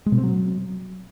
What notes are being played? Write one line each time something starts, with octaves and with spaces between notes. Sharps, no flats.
G#3
B2
C4
F#3